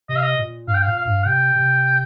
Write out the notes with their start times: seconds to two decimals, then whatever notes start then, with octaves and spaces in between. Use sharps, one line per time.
0.09 C3 D#5
0.16 F5
0.23 D#5
0.39 A#2
0.67 G2 F5
0.74 G5
0.83 A#2 F5
0.97 F5
1.06 G2
1.26 C3 G5
1.56 C3